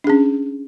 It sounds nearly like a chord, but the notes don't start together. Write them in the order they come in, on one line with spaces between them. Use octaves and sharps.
D4 G#4 C#4